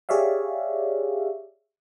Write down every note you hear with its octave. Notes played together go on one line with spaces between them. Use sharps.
G4 G#4 C#5 D5 E5 F5